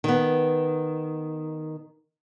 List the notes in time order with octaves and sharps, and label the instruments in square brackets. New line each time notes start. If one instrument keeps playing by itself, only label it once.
[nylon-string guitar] D#3 B3